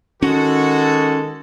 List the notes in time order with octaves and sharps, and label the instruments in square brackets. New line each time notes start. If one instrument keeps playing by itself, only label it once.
[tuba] D#3 [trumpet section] G#3 A4 [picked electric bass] C#4 [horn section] F#4